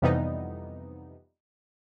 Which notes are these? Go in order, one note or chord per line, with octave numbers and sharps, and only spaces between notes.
F2 C3 E3 G3 B3 D#4